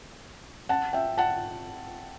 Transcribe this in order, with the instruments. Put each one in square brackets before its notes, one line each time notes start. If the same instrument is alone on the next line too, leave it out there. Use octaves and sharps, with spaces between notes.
[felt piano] F#5 A5
E5 G5
F#5 A5